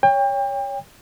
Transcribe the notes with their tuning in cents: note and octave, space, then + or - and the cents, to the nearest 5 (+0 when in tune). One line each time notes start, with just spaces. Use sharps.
C#5 +15 G5 +30